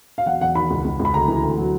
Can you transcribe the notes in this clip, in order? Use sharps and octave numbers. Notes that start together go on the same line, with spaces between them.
F5
E1 F#5
E1 F#5
D#3 B5
C#2
C#2
C#2
B5
D2 A#5
E3
D2
F#3